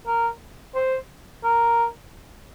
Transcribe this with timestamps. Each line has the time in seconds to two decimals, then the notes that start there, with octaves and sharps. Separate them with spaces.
0.07 A#4
0.75 C5
1.44 A#4